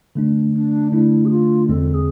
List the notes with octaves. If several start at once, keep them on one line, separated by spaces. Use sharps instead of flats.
D3 A3 D4
D4
D3 A3 D4 E4
G#4
F4
E2 D3 G#3 C4 A4
G#4